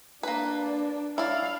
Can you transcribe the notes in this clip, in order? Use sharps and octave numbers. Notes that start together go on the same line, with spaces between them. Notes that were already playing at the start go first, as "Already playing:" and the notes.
A#3 D4 B4
E4 D5 F5